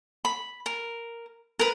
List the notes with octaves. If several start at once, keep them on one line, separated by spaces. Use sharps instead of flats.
B5
A#4
A#4 B4